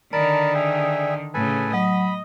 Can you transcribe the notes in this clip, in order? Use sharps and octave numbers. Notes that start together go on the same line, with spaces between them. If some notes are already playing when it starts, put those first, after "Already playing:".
D3 D#3 A#4 D5 A5 B5
G#4 E5 G5
A2 C#3 A4 B4 G#5
F#3 D#5 B5